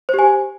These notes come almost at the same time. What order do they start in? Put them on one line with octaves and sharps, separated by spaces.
C5 G4 G#5